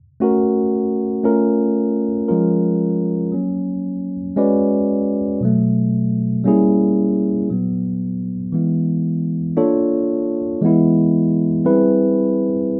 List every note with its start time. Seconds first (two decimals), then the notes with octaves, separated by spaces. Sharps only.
0.20 A3 C#4 F#4 A#4
1.24 A3 C#4 F4 A#4
2.28 F3 G#3 C#4 F4 A#4
3.32 F#3 A#3 C#4
4.36 G#3 C#4 F#4 B4 D5
5.41 B2 F#3 A3
6.44 G3 A#3 C#4 E4 G#4
7.49 A#2 F#3 B3
8.52 E3 G#3 B3 E4
9.57 A#3 D4 F4 A4 C#5
10.61 E3 G#3 B3 E4
11.65 G3 C4 E4 G#4 B4